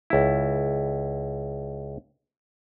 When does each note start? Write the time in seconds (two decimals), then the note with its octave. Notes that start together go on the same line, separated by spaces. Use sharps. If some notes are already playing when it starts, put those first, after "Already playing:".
0.10 C#2 E4